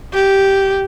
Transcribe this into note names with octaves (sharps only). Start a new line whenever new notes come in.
G4